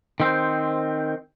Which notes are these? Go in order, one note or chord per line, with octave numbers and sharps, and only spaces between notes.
D#3 C4 C5